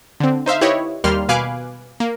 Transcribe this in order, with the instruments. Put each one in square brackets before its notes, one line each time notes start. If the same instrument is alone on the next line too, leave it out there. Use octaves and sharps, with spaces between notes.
[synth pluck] D3 C4
D#4 C5 E5 F5
E4 G4 B4 C#5 D#5
D#2 G3 A#3 C6 F6
B2 B4 F5 G#5 D6 F#6
A#3